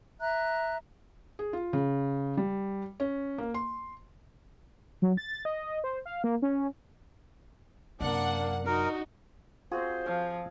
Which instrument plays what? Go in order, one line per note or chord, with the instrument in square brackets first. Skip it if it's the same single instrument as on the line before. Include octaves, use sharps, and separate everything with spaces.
[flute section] E5 A#5 F#6
[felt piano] G#4
F4
C#3
G3
C#4
A#3
C6
[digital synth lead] F#3
A6
D#5
C5
F5
A#3
C#4
[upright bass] F#2 C3 [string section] A#3 F#5 [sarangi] D4
[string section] D#4 [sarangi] F#4 [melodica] A#4
[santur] C4 F#4 G#4 [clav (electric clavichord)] F4 [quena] C5
[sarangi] F3 [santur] F5